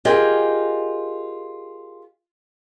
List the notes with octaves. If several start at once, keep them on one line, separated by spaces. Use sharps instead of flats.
F4 G4 G#4 A#4 D#5